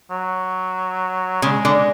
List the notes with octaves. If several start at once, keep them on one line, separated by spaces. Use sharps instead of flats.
F#3
C#3 G#3
D3